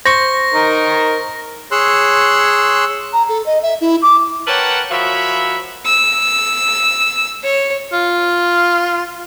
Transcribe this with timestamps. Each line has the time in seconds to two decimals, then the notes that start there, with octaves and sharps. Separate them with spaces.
0.06 C5 C#6 A#6
0.54 D#4 A#4
1.71 G#4 C#5 C6 E6 F#6
3.13 A#5
3.29 A4
3.46 D#5
3.63 E5
3.81 E4
4.02 D6
4.47 A#4 B4 C#5 F#5 G5 A5
4.91 F3 F#4 A#4 C#5 E5 B5
5.86 E6
7.43 C#5
7.92 F4